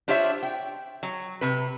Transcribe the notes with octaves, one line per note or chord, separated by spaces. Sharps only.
D4 F4 G4 C5 C#5 E5
G5
F#3
C3 B4